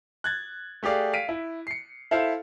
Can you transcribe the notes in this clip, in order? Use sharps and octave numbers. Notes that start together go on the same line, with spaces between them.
F#6 G#6 A6
A3 G4 G#4 D5 F5
F5 B6 D7 D#7
E4
C7 C#7
E4 A4 C5 E5 F5